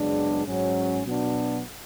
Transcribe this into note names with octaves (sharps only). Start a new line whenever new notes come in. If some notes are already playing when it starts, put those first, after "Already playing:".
Already playing: F#2 C#3 G#3 B3 D4
G#2 F#3 C#4
B2 F#3 B3 D4